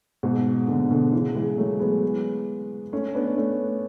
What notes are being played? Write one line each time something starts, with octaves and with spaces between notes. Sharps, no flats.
G#2 B2
B2 D3
B2 D3
C#3 E3
E3 G#3
F#3 A3
G#3 B3
A3 C#4
B3 D4
A3 C#4